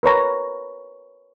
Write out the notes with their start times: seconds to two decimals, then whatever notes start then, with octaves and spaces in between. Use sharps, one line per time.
0.03 A#4 B4 C#5 A#5